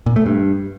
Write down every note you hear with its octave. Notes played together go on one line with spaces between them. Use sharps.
A#2
A3
G2